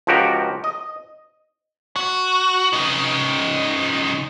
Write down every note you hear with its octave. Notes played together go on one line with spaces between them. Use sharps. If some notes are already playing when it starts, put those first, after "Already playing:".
C#2 F3 F#4 G4 A#4
D#5
F#4
C#3 D#4